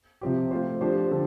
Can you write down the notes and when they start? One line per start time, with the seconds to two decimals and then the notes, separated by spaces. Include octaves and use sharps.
0.21 C3 F3 C4 G4
0.51 A3 F4 C5
0.81 F3 D4 G4 C5
1.11 D3 F3 A4